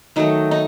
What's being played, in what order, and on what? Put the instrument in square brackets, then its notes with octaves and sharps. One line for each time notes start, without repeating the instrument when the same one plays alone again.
[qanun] D#3 F#3 A3 D#4
D#4